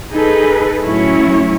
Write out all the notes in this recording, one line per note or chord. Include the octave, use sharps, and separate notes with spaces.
D#4 G#4 A4 B4
A2 F#3 C#4 E4 C#5